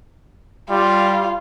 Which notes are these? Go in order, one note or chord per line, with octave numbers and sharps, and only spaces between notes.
G3 F4